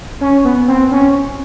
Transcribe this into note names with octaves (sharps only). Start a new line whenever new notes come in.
C#4
B3
C4
C#4